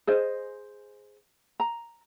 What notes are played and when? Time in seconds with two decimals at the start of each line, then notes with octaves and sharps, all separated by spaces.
0.07 G#4 C5 D#5
1.60 A#5